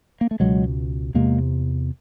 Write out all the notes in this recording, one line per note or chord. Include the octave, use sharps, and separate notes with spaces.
A#3
A3
C#2 B2 F#3 G#3
E2 C3 G#3 A#3